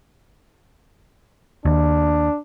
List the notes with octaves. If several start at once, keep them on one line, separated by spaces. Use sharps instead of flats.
D#2 D4